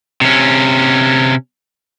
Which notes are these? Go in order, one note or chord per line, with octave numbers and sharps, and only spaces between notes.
C3 C#4